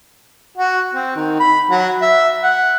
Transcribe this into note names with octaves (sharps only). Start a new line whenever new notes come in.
F#4
C4
D#3
B5
F#3
E5
F#5